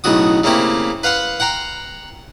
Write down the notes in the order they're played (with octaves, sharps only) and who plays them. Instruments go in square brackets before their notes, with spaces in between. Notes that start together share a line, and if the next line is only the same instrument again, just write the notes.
[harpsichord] B1 A2 C#3 F#4 D#6
C#3 A3 A#3 C4 E4 G4
B4 F5 F#5 C6
F#5 G5 A#5 C6